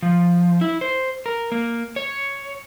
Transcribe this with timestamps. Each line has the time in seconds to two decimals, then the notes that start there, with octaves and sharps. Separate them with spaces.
0.03 F3
0.61 E4
0.81 C5
1.26 A#4
1.52 A#3
1.96 C#5